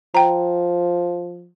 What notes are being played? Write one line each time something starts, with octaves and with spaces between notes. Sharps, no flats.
F3 G5 A#5